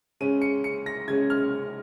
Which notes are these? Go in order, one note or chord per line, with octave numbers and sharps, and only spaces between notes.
C#3 G#3 C#4 D#7
C#7
C#7
A#6
C#3 G#3 C#4 G#6
F6